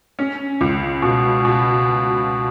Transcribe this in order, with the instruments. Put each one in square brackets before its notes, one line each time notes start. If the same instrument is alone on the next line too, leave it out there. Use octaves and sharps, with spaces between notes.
[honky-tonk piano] C#4
C#2
B2
B2